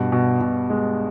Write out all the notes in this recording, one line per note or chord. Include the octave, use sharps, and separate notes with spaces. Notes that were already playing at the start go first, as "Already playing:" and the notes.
Already playing: G2 B2
B2
B2
G#3